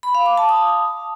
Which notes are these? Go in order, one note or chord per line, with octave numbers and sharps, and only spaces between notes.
B5
F5
D6
A5
D#6